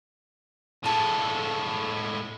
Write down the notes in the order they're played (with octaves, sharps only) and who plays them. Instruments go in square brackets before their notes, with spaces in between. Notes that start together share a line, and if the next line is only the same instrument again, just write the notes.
[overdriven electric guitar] A2 G#3 [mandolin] F4 A4